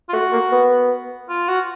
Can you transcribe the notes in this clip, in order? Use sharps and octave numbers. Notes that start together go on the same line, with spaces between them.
F4
A3 F#4
A#3
B3
F4
F#4